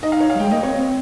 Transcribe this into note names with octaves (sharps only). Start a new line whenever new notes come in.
D#4 D#5
F5
C#5
F5
G3
G#3 G5
A#3 D#5
C4 C#5
C4